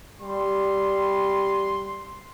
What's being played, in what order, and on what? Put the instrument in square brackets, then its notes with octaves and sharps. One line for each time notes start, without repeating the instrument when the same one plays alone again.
[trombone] G3 [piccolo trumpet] C6